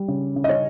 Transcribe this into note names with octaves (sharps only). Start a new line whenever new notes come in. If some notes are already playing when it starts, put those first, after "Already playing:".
Already playing: G3
C#3
C#3
D#5
C#4 C#5